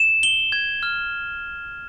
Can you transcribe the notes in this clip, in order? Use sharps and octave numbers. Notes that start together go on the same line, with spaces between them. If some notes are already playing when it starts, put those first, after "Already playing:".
Already playing: E7
G7
G#6
F6